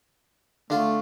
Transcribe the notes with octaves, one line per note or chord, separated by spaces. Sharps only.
D3 A3 F4